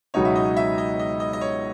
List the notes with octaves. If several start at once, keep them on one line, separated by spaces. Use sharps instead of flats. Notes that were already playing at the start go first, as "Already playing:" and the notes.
C#2 B2 F#3 B3 D#4 C#5
E5
D#5
E5
D#5
D#5
D#5
D#5
C#5